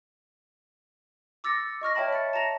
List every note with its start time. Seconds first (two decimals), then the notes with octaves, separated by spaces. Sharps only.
1.44 D6 E6 A6 A#6 C#7
1.81 D#5 C#6 F6 A#6
1.95 C#5 E5 G5 A5 B5
2.13 E5 A6 C#7
2.33 A5 A#5 A#6 F7